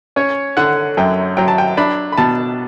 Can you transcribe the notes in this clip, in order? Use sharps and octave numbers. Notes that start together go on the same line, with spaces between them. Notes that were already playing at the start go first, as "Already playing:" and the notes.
C#4 C#5
D3 F#5
F#2 G5
F#3 G5
A5
G5
D4 B5
B5
B2 A5